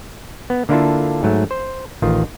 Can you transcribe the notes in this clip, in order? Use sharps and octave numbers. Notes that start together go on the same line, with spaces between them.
B3
D3 A#3 D4 E4 F4 A4
G#2 F#3 A3
C5
A1 D#3 F4